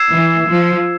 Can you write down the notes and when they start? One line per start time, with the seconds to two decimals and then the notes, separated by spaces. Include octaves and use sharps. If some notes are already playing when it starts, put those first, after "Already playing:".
Already playing: E6 G#6 C7 E7
0.12 E3
0.49 F3